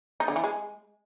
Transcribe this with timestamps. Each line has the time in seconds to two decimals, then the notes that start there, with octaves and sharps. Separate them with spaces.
0.20 D#4
0.28 D3
0.36 E3
0.44 G#3